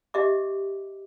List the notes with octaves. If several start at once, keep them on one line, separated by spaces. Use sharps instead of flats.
G4 D#5 E5 D6